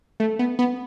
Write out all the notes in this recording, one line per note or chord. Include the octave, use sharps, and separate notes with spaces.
A3
B3
B3